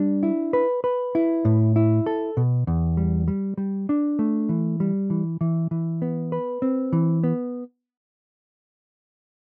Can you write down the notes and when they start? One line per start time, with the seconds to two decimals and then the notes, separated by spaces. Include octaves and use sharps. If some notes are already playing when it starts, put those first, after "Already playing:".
Already playing: G3 D4
0.23 E4
0.53 B4
0.84 B4
1.15 E4
1.45 A2
1.76 E4
2.06 A4
2.37 B2
2.67 E2
2.97 G3
3.28 G3
3.58 G3
3.89 D4
4.19 A3
4.49 E3
4.80 G3
5.10 E3
5.41 E3
5.71 E3
6.02 B3
6.32 B4
6.62 C4
6.93 E3
7.24 B3